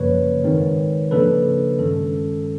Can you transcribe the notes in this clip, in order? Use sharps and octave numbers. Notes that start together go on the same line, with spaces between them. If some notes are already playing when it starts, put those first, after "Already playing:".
Already playing: F#2 C#3 F3 A#3 B4 C#5
G#2 D#3 G#3 C4
C#3 F3 A#3 D4 A4 B4
G2 D#3 G#3 C#4 A4